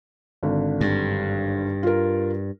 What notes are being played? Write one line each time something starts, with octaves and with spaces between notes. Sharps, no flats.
G#1 D3
G2
F4 A#4